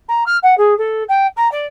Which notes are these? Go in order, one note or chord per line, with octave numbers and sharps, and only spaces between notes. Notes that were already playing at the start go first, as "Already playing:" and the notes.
A#5
F6
F#5
G#4
A4
G5
A#5
D5